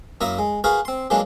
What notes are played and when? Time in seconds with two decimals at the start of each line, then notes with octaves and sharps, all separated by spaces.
0.21 F#2 A#3 E4 E5 A#5 D#6
0.39 G#3
0.64 F#4 G#4 A#4 B4 F5
0.85 C4 C6
1.10 E3 F#3 G#3 A#3 D4